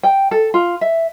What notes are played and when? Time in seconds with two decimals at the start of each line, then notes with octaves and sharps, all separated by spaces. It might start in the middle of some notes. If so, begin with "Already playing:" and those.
0.03 G5
0.31 A4
0.54 F4
0.81 E5